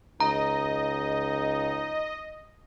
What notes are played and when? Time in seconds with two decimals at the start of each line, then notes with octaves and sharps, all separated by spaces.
0.20 C#2 D#4 D#5 A#5